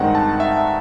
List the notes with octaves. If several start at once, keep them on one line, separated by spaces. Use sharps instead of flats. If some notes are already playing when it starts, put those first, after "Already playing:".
Already playing: G2 D#3 G#3 C4 D#4 F#5
A5
E5